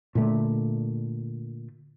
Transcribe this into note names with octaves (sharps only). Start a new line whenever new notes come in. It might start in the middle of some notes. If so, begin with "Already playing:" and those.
A#2 D3 A3